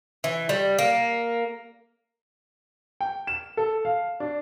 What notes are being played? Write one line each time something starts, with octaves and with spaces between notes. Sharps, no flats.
E3
G3
A#3
G5
E7
A4
F5
D4